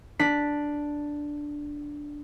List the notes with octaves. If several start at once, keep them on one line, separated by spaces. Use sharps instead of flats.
D4 B6